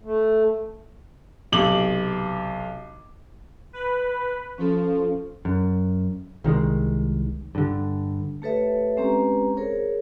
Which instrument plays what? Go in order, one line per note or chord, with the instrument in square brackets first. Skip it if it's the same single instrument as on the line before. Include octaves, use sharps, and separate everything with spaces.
[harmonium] A3
[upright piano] B1 C3 D6 F#7
[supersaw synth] B4
[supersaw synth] F3 [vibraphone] C#4 A4
[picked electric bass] F#2
C2 D#3 F#3 G#3
G2 D3
[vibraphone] A3 G4 A4 B4 C#5 E5
G#3 C4 C#4 G4 B4 A#5
G#4 A#4 C5 C#5